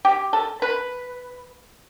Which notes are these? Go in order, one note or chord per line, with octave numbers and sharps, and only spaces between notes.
G4
A4
B4